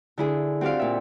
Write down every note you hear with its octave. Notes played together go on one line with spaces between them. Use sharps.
D3 E4 G#4
C4 F#4 G4 D5 F5
A#2 E5